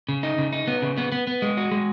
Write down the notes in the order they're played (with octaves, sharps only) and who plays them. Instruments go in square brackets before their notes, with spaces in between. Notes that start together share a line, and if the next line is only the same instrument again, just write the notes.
[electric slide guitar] C#3
D#4
C#3
D#4
B3
C#3
B3
B3
B3
G#3
F#4
G#3